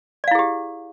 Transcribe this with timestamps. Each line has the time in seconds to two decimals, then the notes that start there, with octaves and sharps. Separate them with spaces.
0.24 D5
0.28 F5
0.31 E4
0.35 G#4
0.39 G4